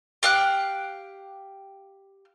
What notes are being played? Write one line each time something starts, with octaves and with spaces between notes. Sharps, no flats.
G4 F5 G5 F#6